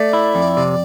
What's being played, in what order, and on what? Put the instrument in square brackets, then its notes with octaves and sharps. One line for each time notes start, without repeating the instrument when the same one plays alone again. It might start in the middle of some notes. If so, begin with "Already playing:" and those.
Already playing: [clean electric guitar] A3 [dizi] D5
[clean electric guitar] E4
F2
C3